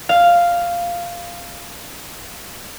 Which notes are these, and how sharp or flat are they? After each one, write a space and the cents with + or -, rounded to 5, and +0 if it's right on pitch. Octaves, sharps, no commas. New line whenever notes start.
F5 -5